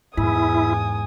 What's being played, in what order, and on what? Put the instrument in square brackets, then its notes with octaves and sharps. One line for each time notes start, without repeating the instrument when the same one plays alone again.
[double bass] E2 [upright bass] G#2 [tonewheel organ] E4 [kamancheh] G#5 D#6